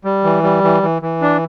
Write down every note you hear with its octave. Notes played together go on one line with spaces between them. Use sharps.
G3
E3
G3
E3
E3
E3
D4